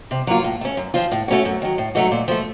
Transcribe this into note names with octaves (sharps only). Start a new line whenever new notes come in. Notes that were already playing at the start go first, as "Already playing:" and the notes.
C3
F#3 A#3 F4
A2
A3 C#4
F#2
F3 C4 F4
A2
A3 C#4 F#4
F#2
D#3 F#3
A2
F#3 A3 D#4 F#4
A#2
F3 A3